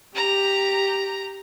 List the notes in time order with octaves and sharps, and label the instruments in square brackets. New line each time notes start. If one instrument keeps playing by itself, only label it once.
[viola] G4 [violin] A#5